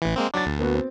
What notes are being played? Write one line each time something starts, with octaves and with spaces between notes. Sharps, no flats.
A1 E3
G#3 A#3 C4
F#3 D4 D6 A6
D2
A#3 B3 F#4
C4